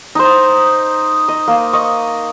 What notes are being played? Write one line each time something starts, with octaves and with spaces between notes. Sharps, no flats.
D#4 C5
D#5
A#3
D#5 C#6